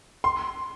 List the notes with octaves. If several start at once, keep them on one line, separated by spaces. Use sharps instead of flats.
C6